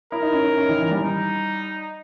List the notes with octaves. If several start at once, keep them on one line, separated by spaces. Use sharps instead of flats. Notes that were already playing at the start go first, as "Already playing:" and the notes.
E4 A#4
D#4
C#4
D#4
C#4
D#3
E3
G3
D#4